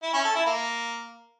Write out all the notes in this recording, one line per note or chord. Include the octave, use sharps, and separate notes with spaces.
E4
C#4
A4
E4
A#3